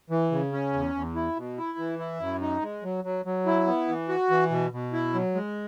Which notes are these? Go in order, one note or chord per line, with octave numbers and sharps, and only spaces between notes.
E3
C#3
C#4
E2
E2
E4
B2
E4
E3
E4
F#2
D#4
G#3
F#3
F#3
F#3
E4
B3
E3
F#4
E3
B2
B2
E4
F#3
G#3